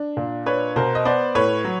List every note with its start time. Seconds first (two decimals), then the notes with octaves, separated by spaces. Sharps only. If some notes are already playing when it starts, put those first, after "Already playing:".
Already playing: D4
0.17 A#2
0.46 D4 B4 C#5
0.76 B2 A#4 C5
0.95 D#5
1.05 B3 C5 D5
1.35 A2 B4 C#5
1.65 F#3